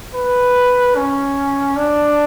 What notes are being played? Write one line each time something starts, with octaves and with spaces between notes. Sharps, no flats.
B4
C#4
D4